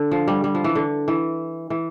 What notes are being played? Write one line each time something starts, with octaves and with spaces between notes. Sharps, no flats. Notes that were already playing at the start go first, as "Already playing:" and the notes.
Already playing: D3
F3
G3
G3
F3
E3
D3
E3
E3